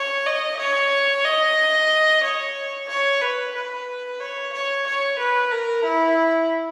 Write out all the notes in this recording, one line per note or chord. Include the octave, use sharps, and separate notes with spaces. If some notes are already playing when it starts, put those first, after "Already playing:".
Already playing: C#5
D#5
C#5
D#5
C#5
C#5
B4
B4
C#5
C#5
C#5
B4
A#4
E4